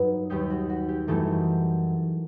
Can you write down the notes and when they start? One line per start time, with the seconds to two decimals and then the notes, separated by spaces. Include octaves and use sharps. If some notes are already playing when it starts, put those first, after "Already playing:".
Already playing: G2 F#3 B3 D#4 B4
0.30 D#2 D#3 G3 D#4 G4
0.50 F#4
0.70 F#4
0.89 G4
1.07 F#2 E3 G3 A3 D#4 A4